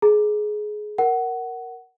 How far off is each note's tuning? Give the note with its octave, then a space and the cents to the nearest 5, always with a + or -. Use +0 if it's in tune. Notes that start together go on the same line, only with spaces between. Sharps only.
G#4 +20 A#5 +0
A#4 +0 F#5 +15